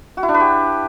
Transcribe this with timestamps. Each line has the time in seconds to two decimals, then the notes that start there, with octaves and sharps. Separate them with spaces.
0.17 F#4
0.23 E4
0.29 D4
0.34 B4
0.40 G4